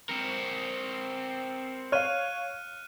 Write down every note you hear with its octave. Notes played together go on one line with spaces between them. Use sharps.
C4 A#4 C#7 E7
C#5 F5 F6 F#6 D#7